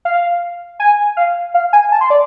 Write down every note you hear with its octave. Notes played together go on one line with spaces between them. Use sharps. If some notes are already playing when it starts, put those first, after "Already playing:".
F5
G#5
F5
F5
G#5
A5
C6
D5